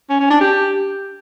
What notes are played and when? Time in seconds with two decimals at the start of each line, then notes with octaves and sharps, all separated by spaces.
0.10 C#4
0.20 C#4
0.30 D4
0.41 G4